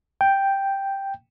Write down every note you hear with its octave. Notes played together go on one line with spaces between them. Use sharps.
G5